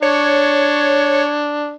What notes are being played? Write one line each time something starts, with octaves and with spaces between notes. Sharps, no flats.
D4 C#5